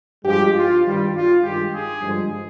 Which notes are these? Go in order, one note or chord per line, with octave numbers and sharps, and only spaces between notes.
G2 F3 G#3 G4
F4
G2 D#3 G3
F4
G2 D#3 G#3 G4
G#4
G2 D3 F3 G#3